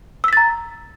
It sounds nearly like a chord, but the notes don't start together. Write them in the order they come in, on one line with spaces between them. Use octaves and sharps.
E6 B6 A6 A#5